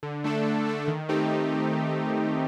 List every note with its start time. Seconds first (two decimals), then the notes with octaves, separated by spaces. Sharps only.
0.03 D3
0.24 A3 D4 A4
0.45 D3
0.66 A3 D4 A4
0.88 D#3
1.09 A3 C4 D#4 G4
1.30 D#3